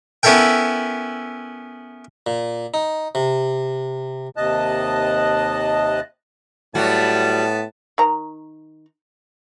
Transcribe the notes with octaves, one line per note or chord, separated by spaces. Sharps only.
B3 C#4 E4 A4 A#4 G5
A#2
D#4
C3
D#2 C3 D#5 A5 F#6
A2 F#3 G3 B3 F#4 A5
D#3 A#5